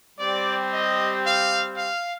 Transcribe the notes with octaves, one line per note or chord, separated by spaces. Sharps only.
G3 C4 G4 D5
D#5
F5
F5